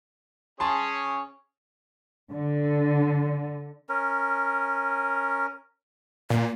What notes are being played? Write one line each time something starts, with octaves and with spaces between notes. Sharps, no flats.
C#4 G#4 C#5 A5 C6
D3
C#4 A#4
A#2 A#3